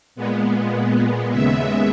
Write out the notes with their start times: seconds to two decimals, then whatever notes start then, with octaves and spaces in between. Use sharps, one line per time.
0.16 A#2 G#3 B3
1.30 D#2 C#3 G#3 B3 E5